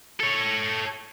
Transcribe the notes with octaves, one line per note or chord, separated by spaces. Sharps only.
A4 C#5